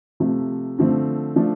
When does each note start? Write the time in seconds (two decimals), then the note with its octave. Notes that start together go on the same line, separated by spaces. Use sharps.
0.20 C3 F3 A3
0.79 D3 F3 A3 C4
1.36 F3 A3 D4